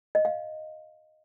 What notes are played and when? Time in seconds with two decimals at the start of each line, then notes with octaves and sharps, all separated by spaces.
0.15 D#5
0.25 F5